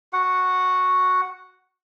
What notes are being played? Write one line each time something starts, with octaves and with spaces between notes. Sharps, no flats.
F#4 F#5